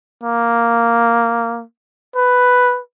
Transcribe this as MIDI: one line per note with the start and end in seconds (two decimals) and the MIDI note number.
0.24 1.64 58
2.16 2.80 71